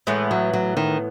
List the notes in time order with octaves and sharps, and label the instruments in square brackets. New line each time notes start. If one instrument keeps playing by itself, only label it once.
[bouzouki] A2 E3 B3 [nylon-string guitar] G#3
[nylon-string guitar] F#3
F#3
D#3